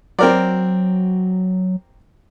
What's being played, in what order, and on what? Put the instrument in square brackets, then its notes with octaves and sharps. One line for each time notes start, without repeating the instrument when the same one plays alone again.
[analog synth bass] F#3 [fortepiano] C4 A#4 D5